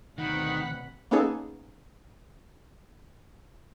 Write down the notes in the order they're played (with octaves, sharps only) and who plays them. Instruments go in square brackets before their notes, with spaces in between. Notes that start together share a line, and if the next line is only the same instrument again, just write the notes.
[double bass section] D2 B2 C4 [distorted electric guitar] D#3 [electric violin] F#5 B5
[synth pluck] A#3 B3 C#4 D#4 G#4 A4